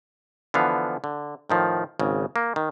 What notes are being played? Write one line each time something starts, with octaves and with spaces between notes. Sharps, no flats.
D3 E3 F3 B3 F5
D3
A2 D#3 F3
G#1 C#3
A#3
D#3